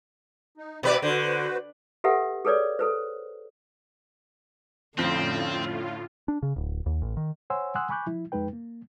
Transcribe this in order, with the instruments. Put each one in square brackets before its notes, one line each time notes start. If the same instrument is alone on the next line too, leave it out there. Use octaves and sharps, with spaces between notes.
[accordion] D#4
[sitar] B2 B4 D5 [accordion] E5 F5
[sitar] D3 [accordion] F#4 B4 C5
[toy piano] G4 A4 B4 E5 F#5
G#4 A4 B4 C#5 D5
A4 B4 C5
[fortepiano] F2 F3 [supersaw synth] A2 F4 [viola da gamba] D3 C#4 [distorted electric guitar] C4
[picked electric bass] D4
C#3
D1
D#2
A1
D#3
[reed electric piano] C5 C#5 F#5 G#5 C6 E6
F#5 G#5 C6 D#6 E6 F#6
G#5 B5 C#6 D6 F#6 G6
F3 E4
F2 G#3 D#4 B4 G5
A#3